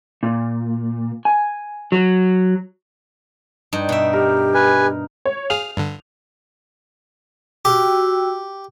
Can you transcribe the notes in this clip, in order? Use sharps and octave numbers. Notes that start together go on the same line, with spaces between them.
A#2
G#5
F#3
G2 D#4
B2 E5
G4 A#4
B4 G#5
C#5
G#4 F5 F7
G2 D3
F#4 G4 G5 E6